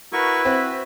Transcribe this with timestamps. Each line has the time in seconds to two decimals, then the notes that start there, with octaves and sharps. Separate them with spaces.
0.13 E4 F#4 A#4 B4 C#6
0.45 C4 F#4 E5